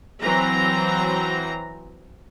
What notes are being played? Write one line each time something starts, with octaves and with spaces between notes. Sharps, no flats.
E3 F#3 C4 A#5